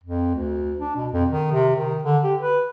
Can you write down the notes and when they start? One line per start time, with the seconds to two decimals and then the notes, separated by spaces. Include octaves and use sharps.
0.03 F2
0.34 D2
0.79 D4
0.96 B2
1.13 F2
1.30 D#3
1.51 C3
1.75 D#3
2.03 D3
2.24 G4
2.39 B4